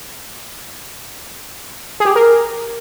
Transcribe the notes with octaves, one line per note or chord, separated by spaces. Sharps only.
G#4
G4
G#4
A#4